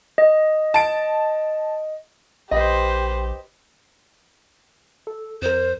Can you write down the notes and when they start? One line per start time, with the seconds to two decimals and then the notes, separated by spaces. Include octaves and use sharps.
0.18 D#5
0.74 A5 D7
2.51 A#1 G4 B4 C5 D#5
5.07 A4
5.42 F2 A#4 C5